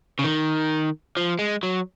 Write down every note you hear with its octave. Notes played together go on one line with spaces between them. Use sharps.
C#3
D#3
F3
G#3
F#3